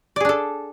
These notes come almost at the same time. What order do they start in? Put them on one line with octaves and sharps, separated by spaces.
D5 G#4 D4 A4